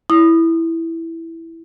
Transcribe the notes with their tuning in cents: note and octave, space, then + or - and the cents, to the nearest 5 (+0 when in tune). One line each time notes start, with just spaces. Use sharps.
E4 +0 D#6 -25